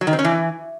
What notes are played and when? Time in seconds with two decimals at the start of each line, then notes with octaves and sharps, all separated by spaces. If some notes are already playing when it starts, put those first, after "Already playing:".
0.01 F#3
0.07 D#3
0.13 C4
0.19 C#4
0.25 E3